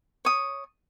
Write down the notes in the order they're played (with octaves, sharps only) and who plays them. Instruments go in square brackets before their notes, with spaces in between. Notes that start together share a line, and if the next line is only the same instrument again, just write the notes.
[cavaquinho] C#5 D#6